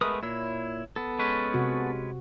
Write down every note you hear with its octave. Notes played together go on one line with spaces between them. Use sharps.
G#3 A3 B3 A#4 B4 D#6
A#2 E4 C#5 E6
B3 A4
G#3 C#4 B4
C3 F#4